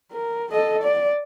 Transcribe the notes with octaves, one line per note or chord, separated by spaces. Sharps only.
A#4
A4 D#5
D5